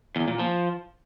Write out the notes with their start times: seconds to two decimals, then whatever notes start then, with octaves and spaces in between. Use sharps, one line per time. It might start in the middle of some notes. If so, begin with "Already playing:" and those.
0.16 E2
0.28 A#2
0.40 F3